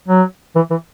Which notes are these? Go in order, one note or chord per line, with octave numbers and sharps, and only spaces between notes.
F#3
E3
E3